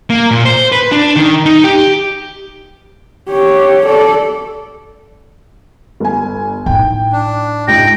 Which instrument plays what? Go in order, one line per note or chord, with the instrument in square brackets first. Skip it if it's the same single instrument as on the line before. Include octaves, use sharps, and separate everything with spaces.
[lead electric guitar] A#3
A#2
C5
B4
D4
D#3
D#4
G4
[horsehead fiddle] G4 C#5
A4 D5
[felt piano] G1 G#5
[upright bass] A2 D#4 [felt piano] G5
[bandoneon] D4
[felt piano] C#2 G#2 [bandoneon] G5 [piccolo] A#6